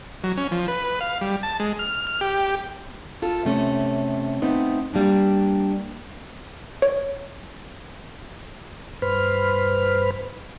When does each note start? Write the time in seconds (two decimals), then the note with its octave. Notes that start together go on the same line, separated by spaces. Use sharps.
0.24 F#3
0.37 C#4
0.51 F3
0.68 B4
1.01 F5
1.21 G3
1.43 A5
1.60 G#3
1.79 F6
2.07 F6
2.21 G4
3.22 F4 A4
3.45 C3 A3 C#4
4.42 A3 B3 C4 D#4
4.94 G3 A#3 D4
6.82 C#5
9.02 G2 B4 C5 B5 F6